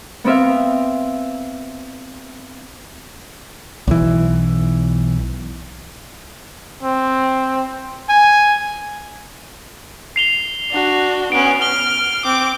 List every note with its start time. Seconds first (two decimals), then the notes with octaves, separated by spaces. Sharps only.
0.24 B3 C4 E5 F5
3.88 B1 E3
6.83 C4
8.09 G#5
10.16 C7 F7 G7
10.71 D4 F#4
11.32 B3 C#4 D7
11.62 F6 G7
12.25 C4 D6